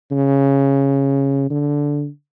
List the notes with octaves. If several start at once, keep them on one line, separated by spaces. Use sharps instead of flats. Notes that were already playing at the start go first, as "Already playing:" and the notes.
C#3
D3